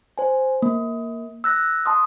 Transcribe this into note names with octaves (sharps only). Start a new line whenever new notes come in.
C5 G#5
A#3
E6 F#6 A#6
A5 C6 D#6